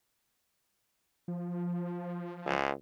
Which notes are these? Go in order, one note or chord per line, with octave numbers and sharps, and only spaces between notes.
F3
C#2